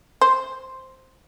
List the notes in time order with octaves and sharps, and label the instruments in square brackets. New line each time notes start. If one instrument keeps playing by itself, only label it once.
[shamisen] C5